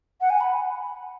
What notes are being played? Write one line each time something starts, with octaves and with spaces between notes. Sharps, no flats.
F#5
G#5
B5